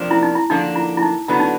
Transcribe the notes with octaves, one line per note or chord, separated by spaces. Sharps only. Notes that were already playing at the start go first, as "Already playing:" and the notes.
Already playing: F2 C3 F3 A#3 D4
E4
D#4
E4
D3 F3 A#3 D4 D#4
E4
E4
D#4
D3 F#3 B3 E4
D#4